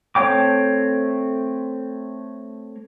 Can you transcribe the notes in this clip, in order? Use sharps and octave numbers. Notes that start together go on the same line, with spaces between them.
A3 C4 C#5 G5 D6